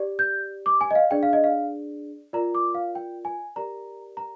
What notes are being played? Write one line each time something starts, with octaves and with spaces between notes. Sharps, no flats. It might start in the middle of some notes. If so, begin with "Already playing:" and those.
Already playing: G4 D5
G6
D6
G#5
D#5
F5
D4 G#4 D5 G5
F5
D#5
F5
F4 A#4 D5 A#5
D6
F5
G5
G#5
G4 A#4 D5 A#5
A#5